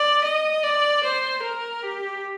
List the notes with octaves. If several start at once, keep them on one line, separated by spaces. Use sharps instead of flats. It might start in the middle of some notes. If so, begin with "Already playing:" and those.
Already playing: D5
D#5
D5
C5
A#4
G4